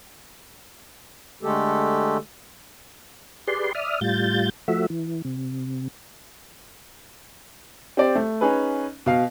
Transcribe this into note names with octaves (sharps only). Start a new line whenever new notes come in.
D3 G#3 A3 G4 A4
G4 G#4 B4 D5 C6
D5 E5 D#6 F6
A2 G3 F4 G6 A6
F3 A3 F#4 E5
E3
C3
C4 G4 D5
A3
C#4 D#4 G#4 B4
B2 F5